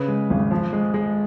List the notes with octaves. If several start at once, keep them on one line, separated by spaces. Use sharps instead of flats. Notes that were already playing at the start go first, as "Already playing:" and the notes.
Already playing: C#3 B4
G#3
G#1
F3
G#3
G#3